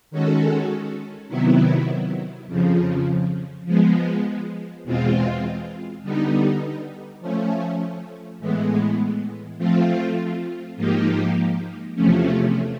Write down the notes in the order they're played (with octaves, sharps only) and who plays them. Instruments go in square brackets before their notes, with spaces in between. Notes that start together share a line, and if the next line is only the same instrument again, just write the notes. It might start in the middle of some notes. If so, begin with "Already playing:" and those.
[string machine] D#3 G#3 C#4 F#4 A4
C3 D#3 F#3 B3 E4
F2 C#3 F3
F3 G#3 B3
E2 B2 G#3 C4 F4
D3 G3 B3 D#4
F3 A3 C#4
A2 E3 G#3 B3
F3 A3 C4 F4
G#2 F3 A#3 D#4 G4
E2 C3 F3 A3 C#4